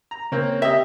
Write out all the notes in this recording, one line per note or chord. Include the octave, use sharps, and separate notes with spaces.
A#5
C#3 A#3 C4 C#4
G4 D#5 E5